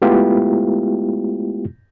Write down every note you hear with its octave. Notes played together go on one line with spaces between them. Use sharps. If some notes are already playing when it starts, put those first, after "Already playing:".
G#3 A3 B3 E4 F4 G4